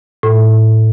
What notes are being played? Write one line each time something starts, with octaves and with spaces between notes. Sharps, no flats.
A2